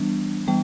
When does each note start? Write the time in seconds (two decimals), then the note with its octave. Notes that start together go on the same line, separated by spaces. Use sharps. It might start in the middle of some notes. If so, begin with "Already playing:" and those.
Already playing: E3 G3 B3 D4
0.47 E3 G3 B3 G5